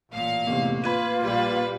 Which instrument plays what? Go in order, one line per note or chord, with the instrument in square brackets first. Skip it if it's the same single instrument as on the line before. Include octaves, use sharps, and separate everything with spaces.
[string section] A1 A#2 F5
[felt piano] F1 E2 C3 [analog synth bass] A#3
[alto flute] F4 [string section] B4 [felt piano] B5 G#6 D#7
[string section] A#1 G3 B4